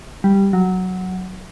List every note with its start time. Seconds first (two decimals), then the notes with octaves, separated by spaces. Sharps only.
0.24 G3
0.53 F#3